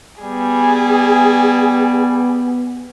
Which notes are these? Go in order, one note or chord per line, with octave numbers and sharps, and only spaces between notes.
G3 B3 G#4